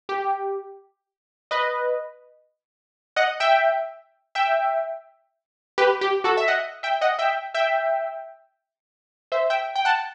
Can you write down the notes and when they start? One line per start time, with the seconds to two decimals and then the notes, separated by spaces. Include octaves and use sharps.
0.09 G4
1.51 B4 D#5
3.16 D#5 F#5
3.40 E5 G5
4.35 E5 G5
5.78 G4 B4
6.01 G4
6.24 F#4 A4
6.37 E5
6.48 D#5 F#5
6.83 E5 G5
7.01 D#5 F#5
7.19 E5 G5
7.54 E5 G5
9.32 C5 E5
9.50 E5 G5
9.75 G5
9.85 F#5 A5